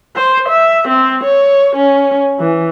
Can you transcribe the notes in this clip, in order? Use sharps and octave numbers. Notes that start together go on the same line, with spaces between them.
C5
E5
C4
C#5
C#4
E3